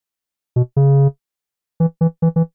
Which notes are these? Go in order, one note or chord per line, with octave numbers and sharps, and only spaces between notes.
B2
C#3
E3
E3
E3
E3